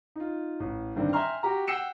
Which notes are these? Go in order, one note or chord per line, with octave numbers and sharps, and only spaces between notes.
D#4 F4
A1
G2 D3 D#3 C4
E5 G5 G#5 A#5 C6 F6
F#4 G4 A#5
F#5 G5 E6 C7 C#7 E7